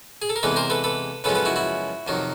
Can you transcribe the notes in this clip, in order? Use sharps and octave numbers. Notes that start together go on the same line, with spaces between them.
G#4
A4
A#4
E2 C3 E3 G#3 A4 B4
A#4 C5
A4 B4
A4 B4
F#2 C#3 F3 G#3 B3 A4 B4
A4 B4
E4 F#4
E4 F#4
F2 C3 D#3 F#3